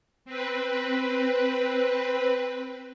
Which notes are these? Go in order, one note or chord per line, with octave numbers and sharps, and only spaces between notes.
C4 B4